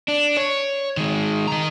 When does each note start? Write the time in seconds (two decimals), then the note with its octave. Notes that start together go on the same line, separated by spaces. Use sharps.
0.08 D4
0.37 C#5
0.97 D#3 G#3
1.48 D#3 A#5